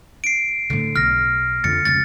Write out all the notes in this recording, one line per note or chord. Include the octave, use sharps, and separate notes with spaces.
C7 D7
A2 D3
B1 F6 A#6
F2 D3 A6 C#7
F1 C#2 A6